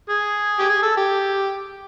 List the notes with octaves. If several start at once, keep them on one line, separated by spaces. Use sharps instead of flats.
G#4
G4
G#4
A4
G4